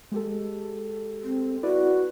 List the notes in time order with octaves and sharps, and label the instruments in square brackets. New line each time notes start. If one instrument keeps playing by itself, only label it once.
[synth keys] G#3 G4 A4
[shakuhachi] C4
[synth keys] E4 B4 D5 [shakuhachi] F#4